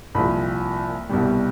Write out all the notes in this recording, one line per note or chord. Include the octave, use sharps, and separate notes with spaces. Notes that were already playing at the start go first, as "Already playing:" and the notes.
C2 A#2 F3 B5
C2 B2 G3